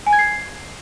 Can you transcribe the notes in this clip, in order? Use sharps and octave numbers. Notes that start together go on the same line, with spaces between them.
G#5
G#6
C7